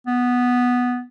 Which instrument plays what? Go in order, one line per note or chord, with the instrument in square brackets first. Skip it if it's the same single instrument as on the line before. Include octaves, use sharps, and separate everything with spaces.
[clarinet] B3